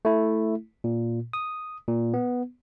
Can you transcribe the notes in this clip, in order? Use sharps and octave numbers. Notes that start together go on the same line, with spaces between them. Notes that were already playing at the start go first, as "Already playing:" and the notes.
A3 E4
A#2
D#6
A#2
B3